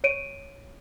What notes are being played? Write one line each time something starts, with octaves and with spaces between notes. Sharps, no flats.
C#5 D7 D#7